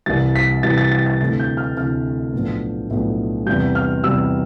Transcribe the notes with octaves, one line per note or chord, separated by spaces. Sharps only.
C2 C3 E3 G3 A6
B6
C2 C3 E3 G3 A6
A6
A6
A6
D2 C3 E3 A3 A6
G6
F6
D2 C3 E3 A3 F6
B1 A2 F3 B3 D4
B1 A2 F3 B3 D4
E2 C3 G3 G6
F6
E2 C3 G3 E6